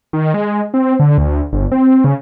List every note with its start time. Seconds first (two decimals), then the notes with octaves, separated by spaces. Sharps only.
0.13 D#3
0.34 G#3
0.74 C4
1.00 D3
1.18 D2
1.53 G1
1.72 C4
2.04 C#3